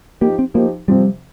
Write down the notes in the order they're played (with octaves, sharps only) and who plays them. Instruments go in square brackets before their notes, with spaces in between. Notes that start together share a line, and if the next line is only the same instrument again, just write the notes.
[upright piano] F3 D#4 G4 [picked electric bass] A#3
[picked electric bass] C4
[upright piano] F3 D#4 G4 [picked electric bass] A#3
[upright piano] C3 F3 C4 [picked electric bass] G3